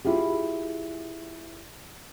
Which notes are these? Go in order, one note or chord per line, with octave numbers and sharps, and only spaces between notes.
E4 F4 G4 G#4